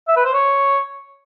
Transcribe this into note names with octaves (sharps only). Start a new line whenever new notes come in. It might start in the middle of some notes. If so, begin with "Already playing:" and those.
E5
B4
C5
C#5